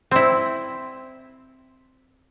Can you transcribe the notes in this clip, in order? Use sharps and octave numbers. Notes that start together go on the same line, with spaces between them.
C4 E4